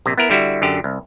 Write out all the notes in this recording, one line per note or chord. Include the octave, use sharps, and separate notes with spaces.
A#1 C3
B3 E4 A#4
D3 G3 E4 F#4
F#2 D3 G4
C2